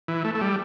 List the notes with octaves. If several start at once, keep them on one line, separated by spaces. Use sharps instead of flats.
E3
A3
A3
G3